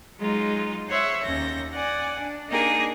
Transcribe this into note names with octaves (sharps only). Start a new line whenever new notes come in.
F#3 G#3 D#4 F4
C5 C#5 E5 F#5 C#6
D#2 C#4 G6 A#6
D5 F#5 G#5
D4
A#3 D4 D#4 G#4 A#4